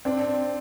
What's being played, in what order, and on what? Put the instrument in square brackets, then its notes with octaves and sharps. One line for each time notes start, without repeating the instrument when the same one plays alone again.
[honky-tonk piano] C4 [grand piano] D4